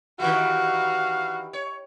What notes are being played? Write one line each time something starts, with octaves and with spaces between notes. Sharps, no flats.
D#3 E3 G3 F#4 F5
C#5